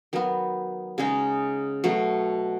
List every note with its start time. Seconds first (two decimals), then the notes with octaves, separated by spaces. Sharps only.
0.13 D#3 F#3 B3
0.98 C#3 G#3 D#4
1.84 B2 F#3 A3